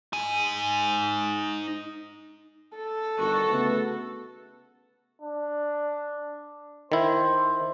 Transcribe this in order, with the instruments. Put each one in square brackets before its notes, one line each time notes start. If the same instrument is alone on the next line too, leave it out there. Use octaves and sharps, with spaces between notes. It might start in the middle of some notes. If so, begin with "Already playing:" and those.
[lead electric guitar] D#4 G#5
[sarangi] A4
[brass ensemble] G1 D#3 [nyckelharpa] F#4
[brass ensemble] C#3 A3 B3
[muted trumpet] D4
[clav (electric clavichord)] D#3 E4 [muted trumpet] C5